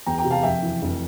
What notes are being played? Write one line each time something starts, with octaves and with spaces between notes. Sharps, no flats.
E2 G5 A#5
G5 A#5
C3
F5 A5
F2 E5 G5
E3
F1